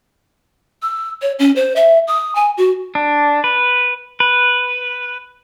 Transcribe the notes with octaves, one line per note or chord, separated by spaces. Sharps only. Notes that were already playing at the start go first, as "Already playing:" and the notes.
E6
C#5
C#4
C5
E5
D#6
G#5
F#4
D4
B4
B4